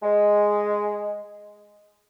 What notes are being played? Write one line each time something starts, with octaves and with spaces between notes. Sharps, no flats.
G#3